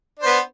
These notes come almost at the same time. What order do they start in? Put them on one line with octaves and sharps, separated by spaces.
D4 C5 B3